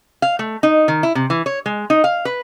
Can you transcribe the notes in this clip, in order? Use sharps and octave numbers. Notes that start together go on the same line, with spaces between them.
F5
A3
D#4
D#3
E4
C3
E3
C#5
G#3
D#4
F5
B4